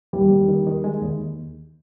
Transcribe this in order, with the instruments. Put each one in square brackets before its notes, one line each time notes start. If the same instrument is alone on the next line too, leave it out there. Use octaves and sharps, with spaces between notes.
[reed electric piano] D#2 [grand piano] G3
[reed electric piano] D#2
D#3
D#3
G#3
D#2